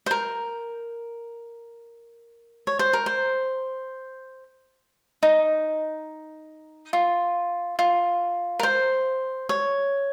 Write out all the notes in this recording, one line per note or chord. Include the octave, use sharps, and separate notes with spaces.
C5
A#4
C#5
C5
A#4
C5
D#4
F4
F4
A#4
C5
C#5